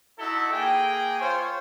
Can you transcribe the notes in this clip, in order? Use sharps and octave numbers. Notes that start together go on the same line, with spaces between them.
D#4 E4 F#4 A4
A#3 G#4 G5
F4 C5 C#5